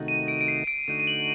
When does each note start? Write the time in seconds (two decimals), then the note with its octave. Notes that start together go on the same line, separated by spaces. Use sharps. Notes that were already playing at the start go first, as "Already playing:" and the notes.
Already playing: C3 D#3 A3 D#4 F#4
0.08 D#7
0.28 D7
0.41 D7
0.48 C7
0.67 D7
0.88 D3 A3 D#4 F#4 D#7
1.00 D#7
1.07 F#7